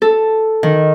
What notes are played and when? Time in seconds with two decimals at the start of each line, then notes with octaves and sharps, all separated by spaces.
0.02 A4
0.63 D#3